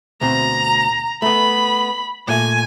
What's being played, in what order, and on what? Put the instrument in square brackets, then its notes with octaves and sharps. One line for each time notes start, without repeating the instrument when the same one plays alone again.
[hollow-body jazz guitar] D2 B2 C4 [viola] A#5
[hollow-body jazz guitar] A3 B3 [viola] B5
[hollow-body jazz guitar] A#2 A3 [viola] G#5